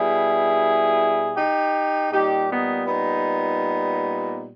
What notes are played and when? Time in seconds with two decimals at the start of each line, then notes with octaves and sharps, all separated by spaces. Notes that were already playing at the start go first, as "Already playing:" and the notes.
Already playing: B2 G3 E4 G#4
1.36 D#4 G4
2.12 A#2 G3 D#4 G4
2.50 B3 D#4
2.88 B3 D#4